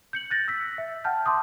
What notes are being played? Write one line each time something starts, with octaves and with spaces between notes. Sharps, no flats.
G6 C#7 F#7
F#6 A6 A#6
E6 B6
E5
F#5 G5 A5 F6 G6
A5 C6 D6 D#6